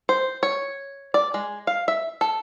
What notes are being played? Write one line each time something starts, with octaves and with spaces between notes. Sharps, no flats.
C5
C#5
D5
G#3
F5
E5
A4